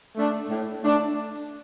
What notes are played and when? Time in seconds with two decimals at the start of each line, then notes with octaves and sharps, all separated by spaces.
0.17 A3 D4
0.50 A2
0.83 A3 D4